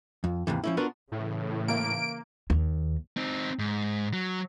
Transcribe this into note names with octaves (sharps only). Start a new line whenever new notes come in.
F2
D#2 G#2 C3 E3
F3 C#4 E4
B3 D4 F4 F#4 A#4 B4
A2 C#3 E3
A#3 D7
D#2
C4 D#4
G#2
F#3